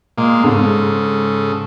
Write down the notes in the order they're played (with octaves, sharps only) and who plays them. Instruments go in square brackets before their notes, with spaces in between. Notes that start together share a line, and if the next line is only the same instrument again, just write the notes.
[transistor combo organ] A#2 G#3 A#3
[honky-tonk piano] G#2 [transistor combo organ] C#3 A4